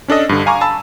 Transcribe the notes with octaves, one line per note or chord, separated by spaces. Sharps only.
C#4 D4 A4 D#5
G2 D3
F5 G#5 A#5 C#6 D6
A5 B5 E6